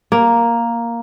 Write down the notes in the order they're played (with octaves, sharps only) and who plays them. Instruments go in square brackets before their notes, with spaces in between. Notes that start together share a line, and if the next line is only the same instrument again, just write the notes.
[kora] A#3